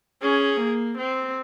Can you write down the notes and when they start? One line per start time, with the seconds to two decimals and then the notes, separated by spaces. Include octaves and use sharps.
0.22 C#4 G#4
0.60 A#3
0.98 C4